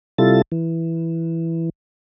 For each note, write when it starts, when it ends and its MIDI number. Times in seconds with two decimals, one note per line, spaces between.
0.18 0.42 48
0.18 0.42 55
0.18 0.42 64
0.18 0.42 65
0.18 0.42 69
0.18 0.42 93
0.52 1.70 52